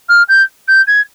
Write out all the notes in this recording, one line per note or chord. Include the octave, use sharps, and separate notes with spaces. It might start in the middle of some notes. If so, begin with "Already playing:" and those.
F6
G6
G6
G#6